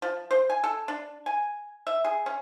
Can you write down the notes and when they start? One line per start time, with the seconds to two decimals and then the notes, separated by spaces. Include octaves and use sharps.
0.02 F3
0.31 C5
0.50 G#5
0.64 A4
0.88 D4
1.26 G#5
1.87 E5
2.05 G#4
2.26 C#4